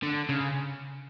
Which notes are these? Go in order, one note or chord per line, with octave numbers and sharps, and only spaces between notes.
D3
C#3